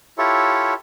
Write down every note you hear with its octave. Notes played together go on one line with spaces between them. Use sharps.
E4 F4 G4 A4 C#5 E5